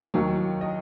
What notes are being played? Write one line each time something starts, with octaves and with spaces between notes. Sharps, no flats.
D#2 D#3 F#3
D#5